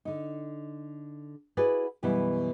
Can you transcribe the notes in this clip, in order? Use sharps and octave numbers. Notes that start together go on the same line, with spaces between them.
D3 D#4
E4 F#4 G#4 B4 D5 D#5
F#2 B2 E3 G3 B3 E4